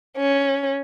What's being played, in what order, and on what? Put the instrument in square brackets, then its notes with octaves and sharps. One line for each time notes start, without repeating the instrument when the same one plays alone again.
[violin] C#4